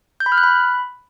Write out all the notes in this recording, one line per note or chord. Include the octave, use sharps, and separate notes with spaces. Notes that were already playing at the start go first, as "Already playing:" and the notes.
G6
B5
F6
F#6
B5